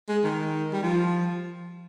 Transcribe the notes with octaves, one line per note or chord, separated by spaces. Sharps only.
G#3
D#3
G3
F3